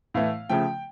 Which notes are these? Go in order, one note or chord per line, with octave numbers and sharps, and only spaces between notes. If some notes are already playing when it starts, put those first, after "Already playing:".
A2 E3 A3 F5
C#3 F3 A3 G5